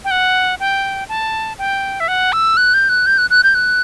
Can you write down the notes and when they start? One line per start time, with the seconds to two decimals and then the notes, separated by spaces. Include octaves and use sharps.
0.05 G5
0.11 F#5
0.60 G5
1.09 A5
1.58 G5
2.00 E5
2.08 F#5
2.33 E6
2.57 F#6
2.74 G6
2.89 F#6
3.06 G6
3.18 F#6
3.30 F#6
3.43 G6
3.55 F#6